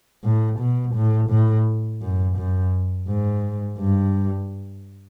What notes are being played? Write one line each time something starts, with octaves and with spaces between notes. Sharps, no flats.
A2
B2
A2
A2
F#2
F#2
G#2
G2